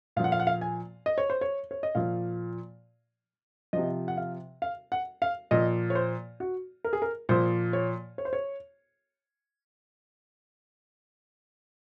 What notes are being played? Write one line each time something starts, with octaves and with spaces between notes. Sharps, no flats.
A#2 F3 F5 F#5
F5
F#5
F5
G#5
D#5
C#5
C5
C#5
C#5
D#5
A#2 F3 F5
C3 F3 D#5
F#5
F5
F5
F#5
F5
A#2 F3 D#5
C#5
C5
F#4
A#4
G#4
A#4
A#2 F3 C5
C#5
C#5
C5
C#5